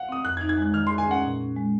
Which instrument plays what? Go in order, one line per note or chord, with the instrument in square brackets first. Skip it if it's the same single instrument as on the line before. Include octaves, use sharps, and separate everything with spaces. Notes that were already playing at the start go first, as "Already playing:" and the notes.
Already playing: [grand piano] F5 F#5
[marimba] C4 [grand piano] D#6
[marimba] F2 [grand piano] F#6
[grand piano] G#6
[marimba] D#4
[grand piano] G#6
[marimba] G#3 [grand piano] F#6
[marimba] D#3 [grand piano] F6
[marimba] G#4 [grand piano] C6
[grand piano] G#5
[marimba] C#4 [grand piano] F#5
[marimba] A#2
C#4
G#3